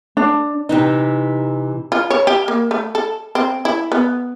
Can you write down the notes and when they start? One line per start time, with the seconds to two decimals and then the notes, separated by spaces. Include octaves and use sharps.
0.17 D4
0.69 C3 E3 D#4
1.92 F4
2.10 C#5
2.27 G4
2.48 A#3
2.71 A3
2.95 A4
3.35 C4
3.65 E4
3.92 B3